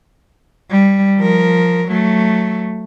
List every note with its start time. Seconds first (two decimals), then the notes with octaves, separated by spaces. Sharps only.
0.70 G3
1.19 F3 A#4
1.88 F#3 A3